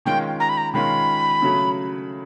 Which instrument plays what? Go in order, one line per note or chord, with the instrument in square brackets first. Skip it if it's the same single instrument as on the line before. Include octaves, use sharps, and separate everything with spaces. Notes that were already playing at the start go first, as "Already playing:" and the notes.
[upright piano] D#3 G#3 C#4 F4 [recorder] G5
[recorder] A#5
B5
A#5
[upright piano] D#3 G#3 C#4 F4 [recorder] B5
[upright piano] C#3 F#3 A3